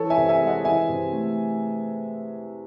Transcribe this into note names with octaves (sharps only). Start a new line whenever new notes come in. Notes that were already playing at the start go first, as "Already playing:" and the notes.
Already playing: E3 A4 C#5
E5 G#5
C3
E5 G#5
G#3
D#5 F#5
E3 E5 G#5
C3
A3